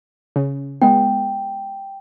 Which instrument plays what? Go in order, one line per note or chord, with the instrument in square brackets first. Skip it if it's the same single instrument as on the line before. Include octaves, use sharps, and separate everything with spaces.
[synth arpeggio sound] C#3
[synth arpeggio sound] G#3 B3 [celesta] G5